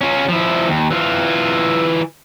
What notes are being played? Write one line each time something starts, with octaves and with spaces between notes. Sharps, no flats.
C#4 F4
F3 E4
D#2
E3 F4